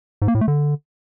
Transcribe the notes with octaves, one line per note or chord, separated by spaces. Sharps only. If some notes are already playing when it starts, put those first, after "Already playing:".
G#2
A#3
A2
A3
D3